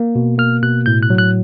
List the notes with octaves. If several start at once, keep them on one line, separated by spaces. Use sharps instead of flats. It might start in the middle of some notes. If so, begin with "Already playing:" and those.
Already playing: A#3
B2
A#3 F6
B2 F#6
A2 G6
F#6
F#3
F#6